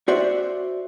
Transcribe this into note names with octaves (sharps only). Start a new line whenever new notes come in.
F#4 C5 D5 E5